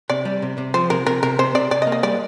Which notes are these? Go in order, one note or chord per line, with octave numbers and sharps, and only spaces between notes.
C3 D5
G3
C3
C3
F3 C5
C3 A#4
C3 A#4
C3 A#4
C3 C5
C3 D5
C3 D5
D#5
A#3
D#5
G3 D5